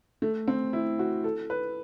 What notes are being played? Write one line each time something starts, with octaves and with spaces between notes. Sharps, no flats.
A3
C4
E4
F#4
A4
B4